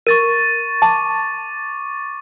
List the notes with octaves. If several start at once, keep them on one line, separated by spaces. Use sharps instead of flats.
A#4 C#6 A6 D#7
A5 D6